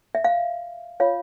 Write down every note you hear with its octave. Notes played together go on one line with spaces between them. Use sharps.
E5
F5
F4 C#5 F5